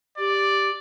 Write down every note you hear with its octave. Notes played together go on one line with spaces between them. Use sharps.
G4 D5